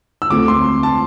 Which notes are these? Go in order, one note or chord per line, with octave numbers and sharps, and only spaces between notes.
E6
D2 D3 A3 C4 F4 D6
C6
A5